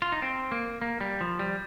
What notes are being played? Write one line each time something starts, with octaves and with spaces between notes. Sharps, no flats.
F4
D#4
C4
A#3
A#3
G3
F3
G3